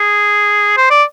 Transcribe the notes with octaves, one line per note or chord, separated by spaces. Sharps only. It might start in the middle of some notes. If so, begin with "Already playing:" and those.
Already playing: G#4
C5
D5